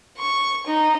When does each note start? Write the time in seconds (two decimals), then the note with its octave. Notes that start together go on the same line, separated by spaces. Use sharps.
0.18 C#6
0.66 D#4